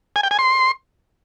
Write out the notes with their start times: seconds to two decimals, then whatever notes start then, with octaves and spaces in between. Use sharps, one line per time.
0.16 G#5
0.23 G5
0.31 G#5
0.39 C6